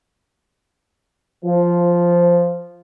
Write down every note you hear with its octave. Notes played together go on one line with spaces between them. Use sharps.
F3